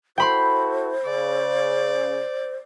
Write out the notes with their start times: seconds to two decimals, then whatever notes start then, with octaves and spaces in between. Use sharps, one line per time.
0.18 E4 F#4 A4 C5 G5 B5 C6
1.05 C#3 D5